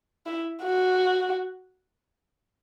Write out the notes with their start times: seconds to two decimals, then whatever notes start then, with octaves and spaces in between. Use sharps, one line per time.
0.26 E4
0.64 F#4